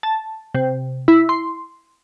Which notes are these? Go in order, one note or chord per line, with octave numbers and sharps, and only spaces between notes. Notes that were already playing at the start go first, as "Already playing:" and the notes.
A5
C3
E4
C6